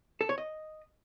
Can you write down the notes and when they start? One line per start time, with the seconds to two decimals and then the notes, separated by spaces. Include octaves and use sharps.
0.21 A4
0.29 C#5
0.38 D#5